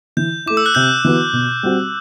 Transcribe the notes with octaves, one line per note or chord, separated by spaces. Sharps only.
E3 G6
A3 E4 D6
E6
F#6
C3 G6
E3 B3 F#4
B2
G3 C4 F#4